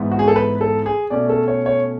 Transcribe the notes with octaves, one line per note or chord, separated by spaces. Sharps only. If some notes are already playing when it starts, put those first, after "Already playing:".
Already playing: G#2 E3 B3
F#4
G#4
A4
B4
A4
G#4
B2 A3 C#4 D5
A4
C#5
C#5